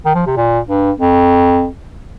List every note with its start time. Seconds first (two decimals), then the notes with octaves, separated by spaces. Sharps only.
0.06 D#3
0.15 F3
0.27 C3
0.37 A#2
0.69 G2
1.00 F2